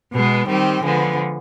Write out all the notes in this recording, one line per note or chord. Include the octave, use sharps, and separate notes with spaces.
B2 G#3 B3
D#3 G3 C4 G4
D3 F3 G#3 B3